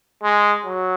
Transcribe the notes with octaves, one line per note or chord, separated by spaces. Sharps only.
G#3
F#3